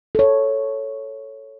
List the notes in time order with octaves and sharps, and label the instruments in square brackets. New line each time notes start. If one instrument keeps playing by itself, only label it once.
[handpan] A4 C#5